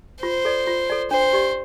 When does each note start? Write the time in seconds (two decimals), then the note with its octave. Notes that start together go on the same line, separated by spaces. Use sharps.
0.23 F4 C5
0.45 A4 D5
0.67 F4
0.90 A4 D5
1.11 D4 C5
1.33 G4 D5